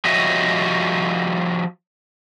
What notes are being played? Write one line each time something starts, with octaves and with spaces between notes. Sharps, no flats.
F3 F#4 G4 C#5 D#5 E5